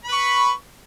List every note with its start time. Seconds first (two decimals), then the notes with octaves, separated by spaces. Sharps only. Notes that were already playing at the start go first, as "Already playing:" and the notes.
0.05 B5
0.08 B4
0.12 C#6